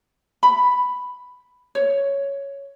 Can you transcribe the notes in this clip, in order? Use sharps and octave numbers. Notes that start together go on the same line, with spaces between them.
B5
C#5